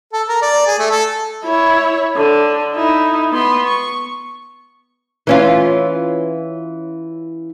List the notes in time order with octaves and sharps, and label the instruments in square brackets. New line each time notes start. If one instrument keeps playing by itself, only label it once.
[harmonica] A4
A#4
D5
G#4
A3
A4
[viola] E4 C#5
D3
D#4 E4
B3 C6
C#6
[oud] E3 C#4 F4